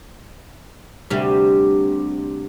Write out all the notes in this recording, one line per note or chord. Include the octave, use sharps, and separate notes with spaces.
D2 C3 G3